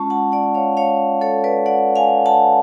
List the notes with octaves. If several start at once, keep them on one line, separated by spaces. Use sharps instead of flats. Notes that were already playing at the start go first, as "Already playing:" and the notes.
Already playing: G#3 C#4 F4 A5 C#6
F#5 A5
D5 F#5
C#5 F5
C#5 F5
A4 C#5
B4 D5
D5 F#5
F5 G#5
F#5 A5